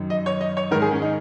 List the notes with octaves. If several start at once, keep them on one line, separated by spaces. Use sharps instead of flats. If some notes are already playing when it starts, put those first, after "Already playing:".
Already playing: F#2 D#3
D#5
C#5
D#5
C#5
G#2 D#3 A#4
G#4
C#4
D#4